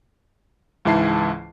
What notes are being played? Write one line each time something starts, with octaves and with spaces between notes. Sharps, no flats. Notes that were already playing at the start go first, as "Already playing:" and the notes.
C#2 G#2 E3 E4 A5 C7